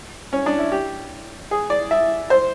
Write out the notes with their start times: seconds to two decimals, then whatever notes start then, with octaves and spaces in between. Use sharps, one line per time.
0.33 C#4
0.46 D4
0.59 E4
0.72 G4
1.51 G#4
1.70 D5
1.91 E5
2.30 C5